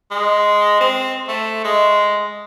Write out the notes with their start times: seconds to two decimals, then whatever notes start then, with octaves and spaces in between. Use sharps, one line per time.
0.11 G#3
0.80 C4
1.28 A3
1.64 G#3